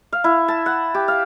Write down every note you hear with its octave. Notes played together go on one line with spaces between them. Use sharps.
F5
E4
A5
F#5
G4
F5